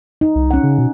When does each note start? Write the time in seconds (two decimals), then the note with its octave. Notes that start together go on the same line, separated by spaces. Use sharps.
0.21 D#4
0.35 C2
0.51 C#4 F#5
0.63 C#3
0.79 B2